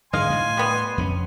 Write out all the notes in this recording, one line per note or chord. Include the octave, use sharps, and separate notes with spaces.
G#2 D3 G#3 D#5 F5 G#5 C6
A2
G3 B3
F2 B3 C#4